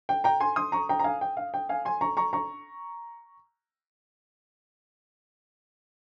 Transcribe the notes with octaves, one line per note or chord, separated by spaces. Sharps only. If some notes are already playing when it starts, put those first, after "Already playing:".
G5
G5 A#5
G#5 C6
C6 D#6
A#5 C#6
G5 A#5
A#5
F5 G#5
G5
F5
G5
F5 G#5
G#5 C6
A#5 C#6
A#5 C#6
A#5 C#6